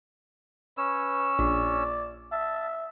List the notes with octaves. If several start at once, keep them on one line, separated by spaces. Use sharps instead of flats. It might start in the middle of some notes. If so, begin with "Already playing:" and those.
C#4 B4 C#5 E6
A#1 D5
E5 A5